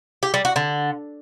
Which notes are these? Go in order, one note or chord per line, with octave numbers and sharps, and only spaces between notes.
G4
G3
F#4
D3